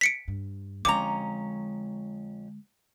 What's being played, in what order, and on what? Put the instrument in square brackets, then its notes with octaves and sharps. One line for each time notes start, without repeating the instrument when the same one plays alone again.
[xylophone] B6 C#7 D7
[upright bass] G2
[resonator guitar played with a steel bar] F2 C#4 A#5 [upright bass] D3 G#3 [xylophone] D6